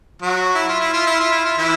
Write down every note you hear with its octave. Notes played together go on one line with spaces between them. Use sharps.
F#3 F#4
E4
F4
E4
F4
E4
F4
E4
F4
E3 E4